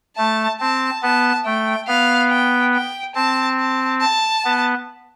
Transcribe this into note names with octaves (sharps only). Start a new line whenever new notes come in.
A3 A5
C4 A5
B3 A5
A3 G5
B3 F5
G5
G5
C4 A5
A5
A5
B3